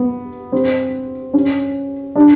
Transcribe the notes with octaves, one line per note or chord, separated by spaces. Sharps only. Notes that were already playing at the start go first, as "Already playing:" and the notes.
Already playing: B3
C4
C#4
D4